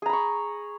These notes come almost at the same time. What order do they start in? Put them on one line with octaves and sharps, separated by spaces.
G#4 A#5 B5 C#6